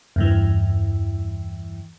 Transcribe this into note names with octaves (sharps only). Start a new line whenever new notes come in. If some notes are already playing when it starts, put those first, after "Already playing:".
E2 G2 E3